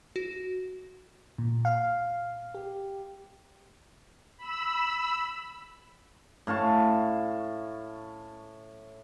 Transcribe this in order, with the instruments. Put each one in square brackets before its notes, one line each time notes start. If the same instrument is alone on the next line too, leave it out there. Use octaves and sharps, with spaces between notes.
[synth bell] F#4
[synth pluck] A#2
F5
G4
[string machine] B5 E6
[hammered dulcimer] A2 F5 A5 C#6